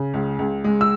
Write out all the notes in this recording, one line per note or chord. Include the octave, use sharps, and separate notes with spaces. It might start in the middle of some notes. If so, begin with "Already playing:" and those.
Already playing: C#3
C#2
C#2
G#3
E6